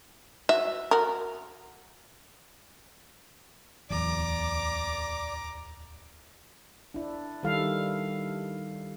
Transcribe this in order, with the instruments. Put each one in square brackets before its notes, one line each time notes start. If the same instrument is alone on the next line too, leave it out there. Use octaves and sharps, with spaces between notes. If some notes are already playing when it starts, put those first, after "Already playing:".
[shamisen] F#4 [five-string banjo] E5
[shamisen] F#4 A#4
[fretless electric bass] D1 E2 [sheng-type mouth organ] D5 [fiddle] A#5 D6
[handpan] D4 E4
D#3 G3 E4 A4 F5